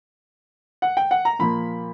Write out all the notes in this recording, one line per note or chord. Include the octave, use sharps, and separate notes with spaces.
F#5
G5
F#5
A#5
A#2 F3 A#3 B5